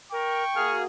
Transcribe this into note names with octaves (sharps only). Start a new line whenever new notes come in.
A#4 G5 C#6
A#3 F#4 G#4 F6